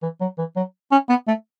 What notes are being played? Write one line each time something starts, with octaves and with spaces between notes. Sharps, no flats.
E3
F#3
E3
F#3
C#4
B3
A3